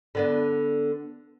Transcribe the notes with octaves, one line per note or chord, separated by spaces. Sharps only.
D3 B3 D4